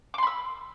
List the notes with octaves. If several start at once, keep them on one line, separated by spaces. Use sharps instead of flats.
B5 C6 D6 E6